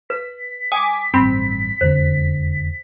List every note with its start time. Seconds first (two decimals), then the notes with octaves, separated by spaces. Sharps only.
0.10 B4 B6
0.72 G5 G#5 D6 D#6
1.14 A1 G2 C4 B5
1.81 E1 F2 D3 C5